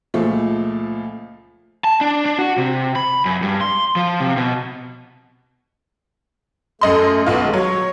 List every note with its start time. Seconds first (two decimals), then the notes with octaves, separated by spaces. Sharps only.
0.14 C#2 A#2 F3 A3
1.84 A5
2.01 D4
2.26 D4
2.39 F#4
2.58 C3
2.96 B5
3.25 F#2
3.42 G2
3.61 C6
3.96 F3
4.20 C3
4.37 B2
6.81 F#2 A3 D#5 C6
7.26 B1 B3 F4
7.42 D#3 G#3 A3
7.54 F#3 C#5